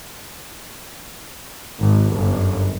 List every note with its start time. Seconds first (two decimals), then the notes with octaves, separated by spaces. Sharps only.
1.78 G#1
2.15 G1 F#2